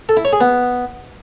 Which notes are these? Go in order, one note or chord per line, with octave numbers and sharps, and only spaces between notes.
A4
E4
C#5
G#4
B3